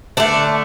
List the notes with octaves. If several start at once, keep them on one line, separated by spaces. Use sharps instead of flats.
D3 A3 D4